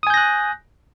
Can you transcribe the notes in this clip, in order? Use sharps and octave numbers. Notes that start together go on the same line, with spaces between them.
G#5 D#6 F#6 G6 A#6